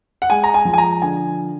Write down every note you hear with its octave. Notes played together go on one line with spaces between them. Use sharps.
F#5
G#3 G#5
A#5
G#5
F3
G#5
A#5
D3 G#5